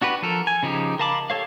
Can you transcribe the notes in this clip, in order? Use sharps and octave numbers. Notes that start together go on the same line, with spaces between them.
D4 F#4 G4 B4
F3 A4 A#4
G#5
C#3 F3 D#4 G4
A#4 F5 A5 B5 D6
G4 A4 C#5 F5